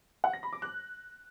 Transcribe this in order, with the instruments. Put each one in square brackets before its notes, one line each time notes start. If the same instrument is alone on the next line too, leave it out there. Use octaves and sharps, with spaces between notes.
[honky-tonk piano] F#5
A#6
B5
D6
F#6